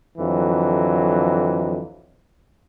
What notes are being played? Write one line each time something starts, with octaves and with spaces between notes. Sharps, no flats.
F2 D3 E3 F#3